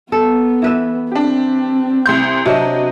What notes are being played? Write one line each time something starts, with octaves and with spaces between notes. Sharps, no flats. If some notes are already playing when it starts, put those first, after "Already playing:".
B3 A4
E3 B4 E5
C4 D4 G4
C2 C6 G6
C3 F#3 D4 F#4 D#5